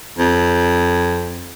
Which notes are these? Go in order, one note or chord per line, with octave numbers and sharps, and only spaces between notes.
F2